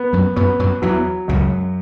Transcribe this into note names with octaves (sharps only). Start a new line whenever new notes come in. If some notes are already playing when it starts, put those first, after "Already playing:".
Already playing: B3
F#2 F#3
F#2 F#3 B3
F#2 F#3
E2 E3 F#3
C#2 F#2 C#3